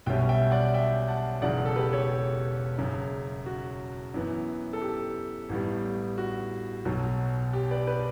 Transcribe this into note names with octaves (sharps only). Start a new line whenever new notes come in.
B1 B2 G3 C#4 E5 G5
E5 G5
D5 F#5
E5 G5
F#5 A5
E1 E2 C#3 F#3 D5 F#5
A4
G4 B4
A4 C#5
G4
F#1 F#2 C#3
F#4
F#2 E3 B3
A4
G4
A1 A2 G3 B3
F#4
B1 B2 F#3
G4
B4 D5
G4 B4